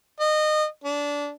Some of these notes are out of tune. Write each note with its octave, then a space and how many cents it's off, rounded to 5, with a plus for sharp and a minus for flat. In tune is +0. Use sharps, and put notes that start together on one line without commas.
D#5 -25
D4 -20